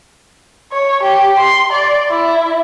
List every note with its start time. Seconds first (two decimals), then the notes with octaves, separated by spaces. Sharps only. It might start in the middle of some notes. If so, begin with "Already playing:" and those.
0.72 C#5
1.03 G4
1.38 C6
1.73 D5
2.11 E4